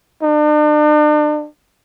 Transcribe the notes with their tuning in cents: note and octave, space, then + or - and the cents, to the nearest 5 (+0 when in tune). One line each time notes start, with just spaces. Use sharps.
D4 +40